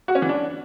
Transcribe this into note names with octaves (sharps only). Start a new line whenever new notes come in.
F#4
C#4
E3
D4